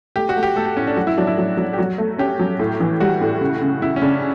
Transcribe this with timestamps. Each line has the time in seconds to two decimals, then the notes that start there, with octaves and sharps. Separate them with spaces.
0.16 A3 G4
0.29 F#4
0.36 A3
0.43 G4
0.56 A3 A4
0.66 G4
0.77 A2 C#4
0.87 D4
0.97 F#3 F#4
1.07 E4
1.17 F#3 D4
1.27 E4
1.38 F#3
1.57 F#3
1.73 G4
1.78 F#3 F#4
1.98 A3
2.18 C#4 G4
2.39 F#3
2.59 A2
2.80 E3
3.00 G3 F#4
3.21 A2
3.41 C#3
3.61 C#3
3.82 C#3 E4
3.96 C#4
4.02 C#3 D4